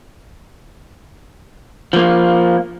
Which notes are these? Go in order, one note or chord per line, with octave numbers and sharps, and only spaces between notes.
F3 A#3